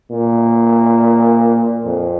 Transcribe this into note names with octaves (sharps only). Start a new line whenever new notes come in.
A#2
F2